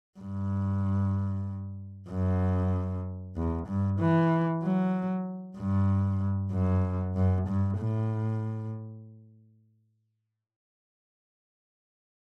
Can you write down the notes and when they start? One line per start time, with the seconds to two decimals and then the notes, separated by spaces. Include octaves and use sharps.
0.19 G2
2.10 F#2
3.37 E2
3.68 G2
3.99 E3
4.63 F#3
5.58 G2
6.53 F#2
7.16 F#2
7.48 G2
7.79 A2